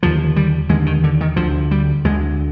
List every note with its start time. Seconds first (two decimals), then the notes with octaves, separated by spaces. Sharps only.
0.02 D#2 D3 F3
0.36 G3
0.69 D#2 D3 G#3
0.86 D#3
1.04 D3
1.21 D#3
1.36 D2 D3 F3
1.71 G3
2.04 D2 D3 G#3